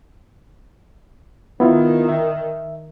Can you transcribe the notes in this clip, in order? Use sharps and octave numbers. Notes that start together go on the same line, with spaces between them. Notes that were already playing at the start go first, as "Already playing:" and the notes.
D#3 B3 E4 F4
E5